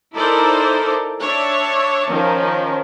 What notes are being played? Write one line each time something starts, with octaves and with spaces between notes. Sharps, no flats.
D#4 E4 A4 A#4 C5 D5
D4 C#5 D5 E5 A5
D#3 F3 C#4